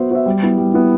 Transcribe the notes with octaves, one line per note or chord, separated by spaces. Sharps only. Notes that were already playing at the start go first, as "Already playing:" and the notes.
Already playing: B3 F#4 C5 E5
F#4 C5 E5
G3
B3 E4
G3
B3 E4